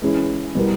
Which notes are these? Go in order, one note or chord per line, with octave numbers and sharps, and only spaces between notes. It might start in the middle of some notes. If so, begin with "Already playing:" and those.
E3 G#3 C#4 E4 G#4
B2 G3 B3 E4 A#4